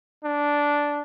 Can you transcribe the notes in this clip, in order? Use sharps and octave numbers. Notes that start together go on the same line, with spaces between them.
D4